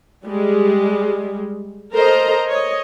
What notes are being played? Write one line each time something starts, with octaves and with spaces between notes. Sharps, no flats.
G3 G#3
A4 A#4 C5 D#5 A#5
C#5 D#5